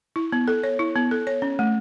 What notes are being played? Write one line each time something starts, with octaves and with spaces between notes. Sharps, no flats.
E4
B3
A4
C#5
E4
B3
A4
C#5
C#4
A3